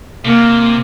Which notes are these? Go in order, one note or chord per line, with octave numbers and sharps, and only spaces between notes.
C3 A#3